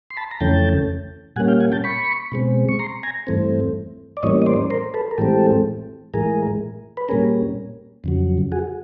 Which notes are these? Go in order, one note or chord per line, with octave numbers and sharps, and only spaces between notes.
C6
A5 B5
A#5
F2 C#3 E3 A3 C#4 G5 A5
A#2 G3 A#3 C#4 F#5 G#5
F5 G5
F#5 G#5
G5 A5
B5 C#6
B2 G#3 C4
C#6
A#5 C6
G#5 A#5
G2 E3 A3 C4
D5
A2 E3 G3 A#3 C#4 C#5 D#5
D#5
C5 D5
A#4 C5
A4 B4
A#4
A2 E3 G#3 C4 G4 A4
A2 E3 G#3 G#4 A#4
B4
A#2 G3 A#3 C#4 G#4 A#4
F2 C#3 F#3
F#4 G#4